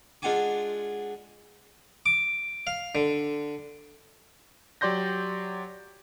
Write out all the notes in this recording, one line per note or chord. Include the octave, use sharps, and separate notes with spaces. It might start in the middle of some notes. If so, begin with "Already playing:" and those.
G#3 D4 F4 F#5 G#5 D6
D6
F5
D3
F#3 G4 D5 C6 G6 A#6